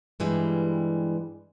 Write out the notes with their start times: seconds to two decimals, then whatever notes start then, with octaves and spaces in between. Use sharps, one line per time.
0.20 G2 E3 G3 G#3